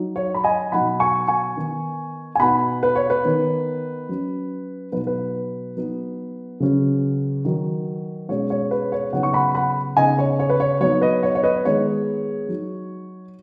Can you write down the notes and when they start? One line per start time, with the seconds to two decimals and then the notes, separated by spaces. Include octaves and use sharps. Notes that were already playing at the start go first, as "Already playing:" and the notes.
Already playing: F#3 D#4
0.16 C#5
0.35 B5
0.44 D#5 G#5
0.72 B2 F#3 D#4 F#5 B5
1.00 G#5 C#6
1.28 G#5 C#6
1.56 D#3 B3 D#4
2.35 G#5
2.40 B2 B3 D#4 F#5 B5
2.83 B4
2.95 C#5
3.10 B4
3.24 D#3 B3 D#4
4.09 F#3 C#4
4.92 B2 F#3 B3 D#4 B4
5.07 B4
5.77 F#3 B3 D#4
6.60 C#3 F#3 C#4
7.45 D#3 F#3 D#4
8.29 B2 G#3 C#4 C#5
8.50 C#5
8.71 B4
8.92 C#5
9.13 C#3 F#3 B3 D#4 C#5 F#5
9.23 C#6
9.33 F#5 B5
9.55 F#5 B5
9.97 C#3 B3 D#4 D#5 G#5
10.19 C#5
10.39 C#5
10.50 B4
10.60 C#5
10.80 F#3 B3 D#4 C#5
11.01 B4 D#5
11.23 C#5
11.35 C#5
11.43 B4 D#5
11.65 D#3 G#3 B3 D#4 C#5
12.49 F#3 D#4